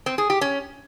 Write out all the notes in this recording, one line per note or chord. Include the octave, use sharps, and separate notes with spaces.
C4
G#4
G4
C#4